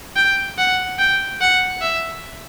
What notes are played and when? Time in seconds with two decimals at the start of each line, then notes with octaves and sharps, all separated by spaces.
0.16 G5
0.58 F#5
0.99 G5
1.41 F#5
1.82 E5